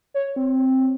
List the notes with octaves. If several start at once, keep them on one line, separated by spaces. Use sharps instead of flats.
C#5
C4